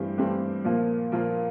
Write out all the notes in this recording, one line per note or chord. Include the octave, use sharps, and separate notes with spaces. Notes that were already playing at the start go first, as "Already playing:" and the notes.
Already playing: G2 E3 A3 C4 G4
G2 E3 A3 C4 G4
A#2 F3 A#3 F4
A#2 F3 A#3 F4